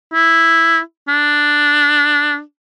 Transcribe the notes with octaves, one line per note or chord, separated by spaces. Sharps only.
E4
D4